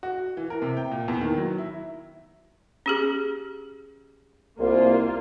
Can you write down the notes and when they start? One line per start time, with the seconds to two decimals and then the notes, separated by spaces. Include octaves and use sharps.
0.03 F#4
0.37 E3
0.50 A#4
0.62 C3
0.77 G5
0.91 A#2
1.08 E2
1.21 D#3
1.38 F#3
1.58 E4
2.86 C#4 G4 G#4
4.59 C2 A#3 F4